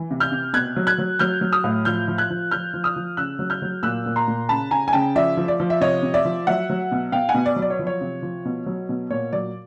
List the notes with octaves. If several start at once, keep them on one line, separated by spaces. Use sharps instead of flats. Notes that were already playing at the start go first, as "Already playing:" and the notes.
Already playing: E3
C3
F6 G6
C3
B2 F#6 G#6
F#3
F#6 G#6
F#3
F#3 F6 G6
F#3
D#6 F6
A2
F3 F6 G6
F3
F#6 G#6
F3
F3 F6 G6
F3
D#6 F6
F3
C#3 E6 F#6
F#3
F6 G6
F#3
A#2 E6 F#6
A#2
A#5 C6
A#2
C#3 A5 B5
C#3 G#5 A#5
G#5
C#3 G5 A5
F3 D5 E5
F3
D5
F3
E5
C3 C#5 D#5
C3
D5 E5
F3
F#3 E5 F#5
F#3
B2
B2 F5 G5
F#5 G#5
B2
D5
F#3
D5
C#5
F3
C#5
C3
F3
B2
F#3
B2
A#2 C#5
F#3 D5